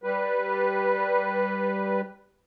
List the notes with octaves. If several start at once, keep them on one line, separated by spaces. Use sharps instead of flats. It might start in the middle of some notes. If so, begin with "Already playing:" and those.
G3 B4